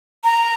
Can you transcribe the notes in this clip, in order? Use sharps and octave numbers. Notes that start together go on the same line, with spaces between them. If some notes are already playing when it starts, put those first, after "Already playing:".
A#5